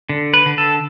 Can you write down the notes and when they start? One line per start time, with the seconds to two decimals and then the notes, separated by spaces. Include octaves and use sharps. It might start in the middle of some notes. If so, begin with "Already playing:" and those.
0.09 D3
0.34 B4
0.46 D3
0.58 A4